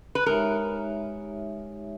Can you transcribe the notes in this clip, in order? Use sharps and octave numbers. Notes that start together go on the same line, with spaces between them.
B4
G#3 D#4 G4 A#4 C#5 E5